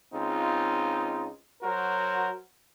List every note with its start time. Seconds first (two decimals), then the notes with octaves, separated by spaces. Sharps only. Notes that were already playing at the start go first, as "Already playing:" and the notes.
0.13 C#2 C4 D#4 F4
1.62 F#3 F#4 A#4 C5